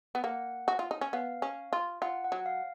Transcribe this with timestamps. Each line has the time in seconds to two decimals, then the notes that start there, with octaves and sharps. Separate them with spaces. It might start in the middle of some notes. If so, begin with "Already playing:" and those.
0.15 B3
0.24 A#3 F#5
0.68 F#4
0.79 F4
0.91 D#4
1.01 C#4
1.13 B3 F5
1.42 C#4
1.73 F4
2.02 F4 F#5
2.24 F#5
2.32 F#3
2.46 F5